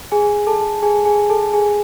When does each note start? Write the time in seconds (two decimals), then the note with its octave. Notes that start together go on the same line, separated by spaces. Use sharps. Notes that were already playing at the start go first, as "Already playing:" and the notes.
0.12 G#4 G#5
0.47 A4 A5
0.82 G#4 G#5
1.05 G#4 G#5
1.30 A4 A5
1.53 G#4 G#5